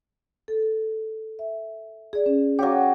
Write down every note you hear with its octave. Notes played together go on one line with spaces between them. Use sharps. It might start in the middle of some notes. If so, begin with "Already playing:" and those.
A4
E5
G#4 D5
C#4
F#3 G4 C#5 F5 D6